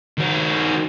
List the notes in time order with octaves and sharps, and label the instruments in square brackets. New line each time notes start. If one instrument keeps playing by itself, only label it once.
[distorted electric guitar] D#3 F#4